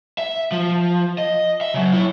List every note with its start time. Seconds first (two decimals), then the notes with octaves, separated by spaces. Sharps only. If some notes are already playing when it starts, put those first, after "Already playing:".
0.18 E5
0.52 F3
1.18 D#5
1.61 E5
1.74 C#3 F#3
1.93 E4 C#5